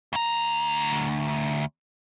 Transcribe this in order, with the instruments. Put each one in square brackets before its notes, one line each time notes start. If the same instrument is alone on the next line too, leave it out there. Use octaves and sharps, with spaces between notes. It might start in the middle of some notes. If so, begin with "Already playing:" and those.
[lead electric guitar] D2 A#5